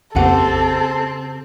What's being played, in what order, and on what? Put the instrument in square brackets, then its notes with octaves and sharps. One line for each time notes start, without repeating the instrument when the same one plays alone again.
[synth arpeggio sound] A#1 F2 F#5 [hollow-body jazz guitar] C#3 G4 [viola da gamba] C4 [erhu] A4